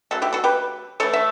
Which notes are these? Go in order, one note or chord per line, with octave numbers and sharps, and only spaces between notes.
C#3 F#3 A3 A4
E4 G4
F#4 A4
G4 B4
E3 A3 A4 C#5
E5